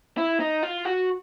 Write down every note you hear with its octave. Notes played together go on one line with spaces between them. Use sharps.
E4
D#4
F4
F#4